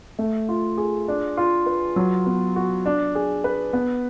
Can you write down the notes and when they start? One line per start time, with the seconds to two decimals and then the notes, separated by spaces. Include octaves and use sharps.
0.19 A3
0.49 F4
0.78 G#4
1.08 D4
1.37 F4
1.66 B4
1.96 F#3
2.26 B3
2.56 F#4
2.86 D4
3.15 G#4
3.44 B4
3.73 B3